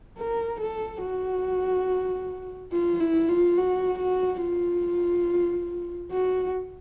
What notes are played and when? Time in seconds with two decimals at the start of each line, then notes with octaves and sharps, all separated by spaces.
0.18 A#4
0.61 A4
1.02 F#4
2.72 F4
3.00 E4
3.29 F4
3.57 F#4
3.99 F#4
4.42 F4
6.12 F#4